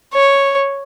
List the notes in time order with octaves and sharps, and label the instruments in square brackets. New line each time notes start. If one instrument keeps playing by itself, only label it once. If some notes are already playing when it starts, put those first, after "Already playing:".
[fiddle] C#5